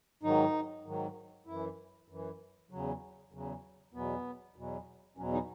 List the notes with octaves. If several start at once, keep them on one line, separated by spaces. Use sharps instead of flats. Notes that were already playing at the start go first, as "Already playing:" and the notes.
G#2 D#3 F#3 D#4
G#2 D#3 F#3
F#2 E3 E4
F#2 E3
E2 C#3 F#3
E2 C#3 F#3
E2 B2 F#3 B3
E2 B2 F#3
E2 B2 F#3 C#4
D#4